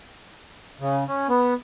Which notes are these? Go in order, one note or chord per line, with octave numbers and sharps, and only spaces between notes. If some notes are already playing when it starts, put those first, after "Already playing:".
C#3
C#4
B3